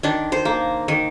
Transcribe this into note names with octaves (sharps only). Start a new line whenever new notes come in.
D#3 D4
C5
A#3
D#3